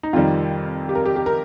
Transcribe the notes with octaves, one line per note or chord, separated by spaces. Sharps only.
D#4
F2 C3 D#3 G3 F4
G4
A#4
G4
G4
A#4